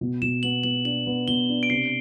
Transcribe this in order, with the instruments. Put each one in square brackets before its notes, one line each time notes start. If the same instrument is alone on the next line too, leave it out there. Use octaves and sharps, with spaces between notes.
[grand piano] B2
[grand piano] B2 [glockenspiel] E7
[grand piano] B3 [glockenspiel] F#7
[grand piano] B3 [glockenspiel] F#7
[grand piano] D4 [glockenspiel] F#7
[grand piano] B3
[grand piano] B2 [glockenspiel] G7
[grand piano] D4
[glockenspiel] D7
[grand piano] C3 [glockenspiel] C7